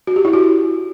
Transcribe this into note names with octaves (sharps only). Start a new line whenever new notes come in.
F#4
G4
E4
F#4